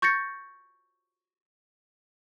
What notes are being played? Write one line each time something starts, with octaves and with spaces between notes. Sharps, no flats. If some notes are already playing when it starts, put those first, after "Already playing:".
C#6 G6 A6 A#6 C#7